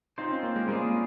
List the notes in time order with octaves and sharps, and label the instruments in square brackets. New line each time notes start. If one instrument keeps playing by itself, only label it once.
[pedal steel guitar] C4 F4 C5 [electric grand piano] D#4
[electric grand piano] C#4
A#3
G#3
[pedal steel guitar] G3 C#4 F4 G#4 [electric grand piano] A#3